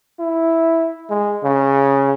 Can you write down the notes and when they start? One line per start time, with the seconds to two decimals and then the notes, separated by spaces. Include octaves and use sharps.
0.19 E4
1.10 G#3
1.43 C#3